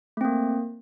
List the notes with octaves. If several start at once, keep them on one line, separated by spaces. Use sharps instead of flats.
A3 A#3 C4